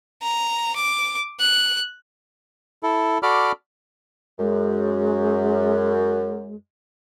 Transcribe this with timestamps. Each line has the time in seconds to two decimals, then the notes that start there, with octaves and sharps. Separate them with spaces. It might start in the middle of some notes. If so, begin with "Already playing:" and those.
0.22 A#5
0.76 D6
1.40 F#6
2.83 E4 A4
3.23 F#4 A4 D5 B5 D6 F6
4.39 F#2 G#3